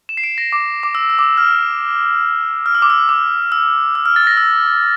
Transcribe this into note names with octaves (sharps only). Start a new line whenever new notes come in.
E7
C7
D7
A#6
D6
D6
E6
E6
D6
E6
F6
F6
E6
D6
E6
D6
E6
E6
F6
A6
A#6
E6